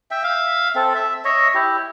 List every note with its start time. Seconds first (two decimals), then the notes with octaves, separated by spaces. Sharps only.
0.11 E5 G5
0.23 E5 F5
0.75 C4 A4
0.95 E5
1.25 C#5 D#5 E5
1.55 E4 G4